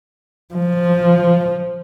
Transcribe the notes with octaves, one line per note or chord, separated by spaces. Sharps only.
F3